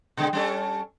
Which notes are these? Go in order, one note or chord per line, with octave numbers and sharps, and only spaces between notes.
B2 D3 G#3
G3 C#4 A4